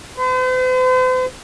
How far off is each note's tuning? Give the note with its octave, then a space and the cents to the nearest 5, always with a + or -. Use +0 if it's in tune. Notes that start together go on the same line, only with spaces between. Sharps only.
C5 -45